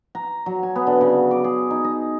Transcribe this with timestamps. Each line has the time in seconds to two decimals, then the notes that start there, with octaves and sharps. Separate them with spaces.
0.15 A#5
0.46 F#3
0.63 G#5
0.76 B3
0.87 D3
1.01 C#3
1.31 D6
1.44 G#4
1.71 D#4
1.84 D#5